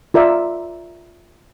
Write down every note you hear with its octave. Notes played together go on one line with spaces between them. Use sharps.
F4 A#4 D5 E5